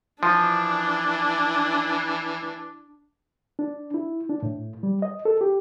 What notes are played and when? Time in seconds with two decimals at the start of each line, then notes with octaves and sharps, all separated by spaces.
0.23 E3 F3 D4
3.59 D4
3.94 E4
4.29 D4
4.43 A2
4.83 G3
5.02 D#5
5.25 A4
5.41 G4